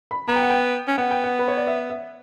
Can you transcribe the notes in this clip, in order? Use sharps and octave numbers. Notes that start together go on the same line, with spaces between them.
B5
B3 A#5
G5
F#5
G5
C#4
B3 F#5
G5
F#5
B4
C#5
D5
E5
E5